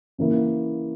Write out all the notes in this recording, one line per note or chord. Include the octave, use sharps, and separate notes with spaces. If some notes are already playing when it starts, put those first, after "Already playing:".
C#3 E3 A#3 E4